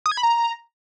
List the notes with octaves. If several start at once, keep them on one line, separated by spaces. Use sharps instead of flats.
D#6
G#6
B5
A#5